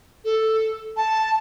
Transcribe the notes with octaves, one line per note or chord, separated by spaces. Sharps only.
A4
A5